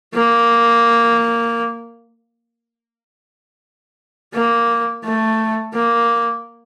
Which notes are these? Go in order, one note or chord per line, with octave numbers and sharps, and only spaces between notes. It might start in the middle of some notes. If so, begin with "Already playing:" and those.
A#3
A#3
A3
A#3